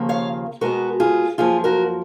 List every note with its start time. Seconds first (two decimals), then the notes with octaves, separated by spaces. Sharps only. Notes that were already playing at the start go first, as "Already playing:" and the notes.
Already playing: D#2 C#3 F3 A#3
0.09 C#5 F5
0.61 B2 G#3 B3 F#4 A#4
1.00 F4 G#4
1.38 F#2 F3 A#3 F4 G#4
1.64 F#4 A#4